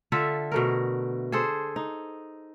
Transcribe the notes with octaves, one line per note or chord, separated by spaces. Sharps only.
D3 F4 A4 E5
B2 A3 A#4
G#4 A4 C5
D#4